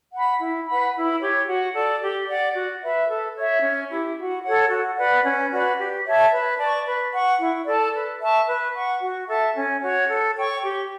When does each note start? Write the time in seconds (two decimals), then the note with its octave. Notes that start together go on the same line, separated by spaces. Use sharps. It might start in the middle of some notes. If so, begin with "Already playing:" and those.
0.13 F#5 B5
0.40 E4
0.66 B4 F#5 B5
0.94 E4
1.20 G4 C#5
1.47 F#4
1.74 A4 D5
2.01 G4
2.28 D5 F#5
2.55 F#4
2.82 B4 E5
3.09 A4
3.36 C#5 E5
3.62 C#4
3.90 E4 G4
4.17 F#4
4.43 A4 C#5 F#5
4.70 F#4
4.97 B4 D5 F#5
5.24 C#4
5.51 F#4 B4 D5
5.78 G4
6.05 C#5 E5 A5
6.32 B4
6.59 D5 A5 C#6
6.86 B4
7.13 F#5 C#6
7.39 E4
7.66 A4 D5 A5
7.94 B4
8.20 E5 A5 C#6
8.47 B4
8.74 F#5 C#6
9.01 F#4
9.28 A4 E5 A5
9.55 C#4
9.82 F#4 C#5
10.09 A4
10.36 C#5 G5 C#6
10.62 G4